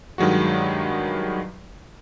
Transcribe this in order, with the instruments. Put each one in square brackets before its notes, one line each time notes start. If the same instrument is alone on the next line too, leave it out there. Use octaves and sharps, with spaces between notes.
[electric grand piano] G2 D#3 F#3 G#3 F#4